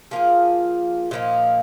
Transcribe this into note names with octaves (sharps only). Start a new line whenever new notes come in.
F3 A#3 F4 G#4
A#2 F3 A#3 D#4